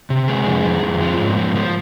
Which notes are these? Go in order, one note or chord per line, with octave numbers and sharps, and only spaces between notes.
C3
G#3 G#4
F2
F2
F2
F3
G#2
F3
F3